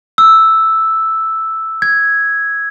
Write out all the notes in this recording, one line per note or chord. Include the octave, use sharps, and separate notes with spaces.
E6
G#6